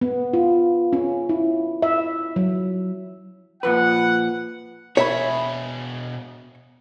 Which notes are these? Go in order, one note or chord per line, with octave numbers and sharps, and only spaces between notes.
B3
F4
C#4
E4
E5
F#3
A#2 F3 B4 F#5
B2 G#4 C#5 E5 B5